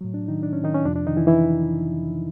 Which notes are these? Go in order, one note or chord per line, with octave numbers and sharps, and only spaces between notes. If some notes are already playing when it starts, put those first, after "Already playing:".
A2 F#3
D4
D#3 D#4
D4
C#4
D#3 D#4
C#4
F2 C3 F3 D4
D4
D#3 D#4
E3 E4
E3 E4